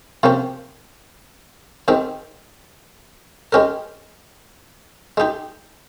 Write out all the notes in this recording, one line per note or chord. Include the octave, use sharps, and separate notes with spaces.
C3 F3 A#3 C#4 G4
D#3 G#3 C4 G4
G#3 C#4 G4 A#4
G#3 D#4 G4